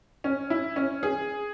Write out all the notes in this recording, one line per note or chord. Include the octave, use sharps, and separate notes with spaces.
C#4
E4
C#4
G#4